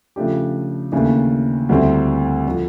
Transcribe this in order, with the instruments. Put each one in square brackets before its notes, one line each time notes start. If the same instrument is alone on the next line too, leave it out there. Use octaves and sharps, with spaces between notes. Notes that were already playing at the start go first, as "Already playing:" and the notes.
[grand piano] C#3 F3 A3 D4 G4
D#2 C#3 E3 A3 D4
D2 D3 G3 C4 E4
D3 F3